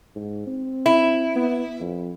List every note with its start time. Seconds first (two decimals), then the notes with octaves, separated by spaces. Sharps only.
0.16 G#2
0.47 C4
0.86 E4
1.36 B3
1.80 F2